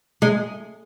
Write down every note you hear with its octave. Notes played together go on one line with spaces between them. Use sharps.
G#3